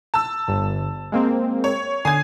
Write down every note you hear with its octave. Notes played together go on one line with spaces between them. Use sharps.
A5 E6
G1
G#3 A#3 C4
C#5
D3 G#5 D#6 G#6 C7